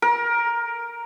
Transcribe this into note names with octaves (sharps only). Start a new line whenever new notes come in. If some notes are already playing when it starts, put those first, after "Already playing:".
A#4